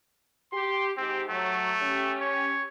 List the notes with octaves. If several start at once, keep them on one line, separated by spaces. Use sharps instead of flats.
G4 C6
G#2 C4 G4
F#3 A3
C#4 G4
C#5